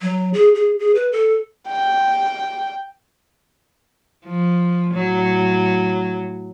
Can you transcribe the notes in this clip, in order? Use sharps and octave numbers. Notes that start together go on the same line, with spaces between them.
F#3
G#4
G#4
G#4
B4
A4
G5
F3
A2 F#3